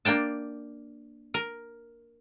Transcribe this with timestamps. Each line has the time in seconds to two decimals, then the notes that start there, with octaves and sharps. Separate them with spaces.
0.05 A#3 D4 G5 A5
1.34 A#4